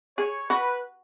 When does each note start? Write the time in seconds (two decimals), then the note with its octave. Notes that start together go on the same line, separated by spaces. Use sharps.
0.18 G#4 C#5
0.50 F#4 B4